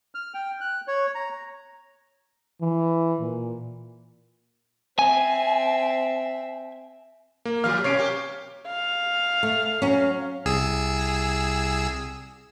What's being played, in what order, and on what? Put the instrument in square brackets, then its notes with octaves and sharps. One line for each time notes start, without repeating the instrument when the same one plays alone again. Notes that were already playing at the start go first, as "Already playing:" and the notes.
[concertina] F6
G5
F#6
C#5
A#5
[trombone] E3
A#2
[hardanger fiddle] C4 E5 [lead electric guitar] G#5
[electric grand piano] A#3
[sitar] A#2 F3 G3 [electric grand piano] F5 F6
[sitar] B2 C#4 [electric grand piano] C#5 C7 D7
[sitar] A#3 G4
[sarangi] F5
[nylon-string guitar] A3
F#3 C#4
[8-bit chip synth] C2 G#4 E6